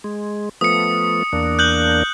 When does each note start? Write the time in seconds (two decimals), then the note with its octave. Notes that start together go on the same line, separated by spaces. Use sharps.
0.04 G#3
0.61 F3 A3 B3 D#6 C#7
1.33 E2 A#3 D4
1.59 F#6 G6 F#7